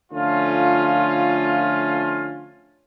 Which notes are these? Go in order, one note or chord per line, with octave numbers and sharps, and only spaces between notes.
D3 F3 A3 C#4 F4